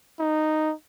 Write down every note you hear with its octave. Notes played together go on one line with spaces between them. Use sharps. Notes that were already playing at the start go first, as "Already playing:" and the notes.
D#4